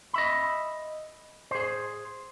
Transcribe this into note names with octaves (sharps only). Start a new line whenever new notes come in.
D#5 E5 B5
G#4 C5